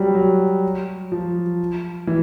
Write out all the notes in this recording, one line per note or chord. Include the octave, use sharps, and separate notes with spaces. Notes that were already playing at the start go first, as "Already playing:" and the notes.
Already playing: F#3 G3
F#3
F3
E3